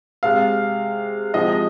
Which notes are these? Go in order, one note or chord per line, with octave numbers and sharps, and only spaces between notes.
C3 G#3 F5
C3 F3 G#3 D#5